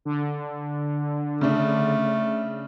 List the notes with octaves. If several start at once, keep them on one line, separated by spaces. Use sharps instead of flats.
D3
C#3 A3 D4